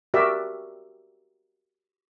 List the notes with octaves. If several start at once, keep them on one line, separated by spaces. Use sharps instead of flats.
F#4 G4 A#4 D5 E5